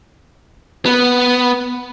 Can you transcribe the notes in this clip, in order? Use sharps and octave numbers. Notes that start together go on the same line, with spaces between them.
B3